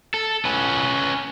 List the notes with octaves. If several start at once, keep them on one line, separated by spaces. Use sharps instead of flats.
A4
C#4 B4